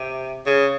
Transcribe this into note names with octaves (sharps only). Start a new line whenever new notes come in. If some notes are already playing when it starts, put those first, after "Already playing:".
Already playing: C3
C#3